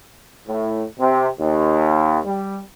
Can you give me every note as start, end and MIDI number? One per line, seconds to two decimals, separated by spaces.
0.47 0.83 45
0.99 1.26 48
1.39 2.19 39
2.24 2.58 55